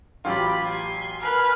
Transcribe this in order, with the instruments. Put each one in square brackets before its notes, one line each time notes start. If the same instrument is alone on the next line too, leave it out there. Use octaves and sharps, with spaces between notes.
[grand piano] A1 F#3 F4 [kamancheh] G4 B5
[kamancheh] G#5 C6
[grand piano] A#4 G#5 [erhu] B4 [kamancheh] F6